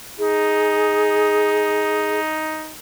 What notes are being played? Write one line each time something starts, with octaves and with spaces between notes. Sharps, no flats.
D#4 G#4